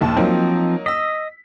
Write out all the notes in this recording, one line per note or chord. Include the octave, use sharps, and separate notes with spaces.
A#1 D#2 A5
F3 F#3 A#3 C4 D#4
D#5 E6 B6